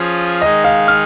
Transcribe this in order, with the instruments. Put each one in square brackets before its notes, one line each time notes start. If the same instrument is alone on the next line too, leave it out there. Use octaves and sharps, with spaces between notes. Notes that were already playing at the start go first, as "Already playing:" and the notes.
Already playing: [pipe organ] F3 C#4 F4 G#4
[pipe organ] D#3 G#3 D#4 G#4 [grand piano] D#5
[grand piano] F5
F6